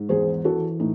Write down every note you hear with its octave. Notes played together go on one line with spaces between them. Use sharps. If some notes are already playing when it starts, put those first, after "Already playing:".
Already playing: G#2
E2 G#4 C5
E3 F#4 A4
A2 D#4